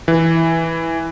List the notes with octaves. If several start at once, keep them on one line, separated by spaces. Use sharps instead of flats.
E3